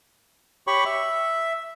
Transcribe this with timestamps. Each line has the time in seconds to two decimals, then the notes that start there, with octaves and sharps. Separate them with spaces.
0.67 G4 C#5 B5 C#6
0.85 E5